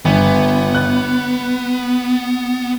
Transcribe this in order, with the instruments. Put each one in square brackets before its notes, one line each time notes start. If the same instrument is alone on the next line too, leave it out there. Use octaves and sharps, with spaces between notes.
[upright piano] G1 [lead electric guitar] B3
[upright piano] F#6